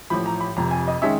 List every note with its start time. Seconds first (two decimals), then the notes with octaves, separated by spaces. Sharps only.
0.10 A1 A2 F3 B5
0.26 A#5
0.41 B5
0.57 F1 F2 C3 A#5
0.71 G#5
0.88 D#5
1.02 D#3 G#3 C#4 E5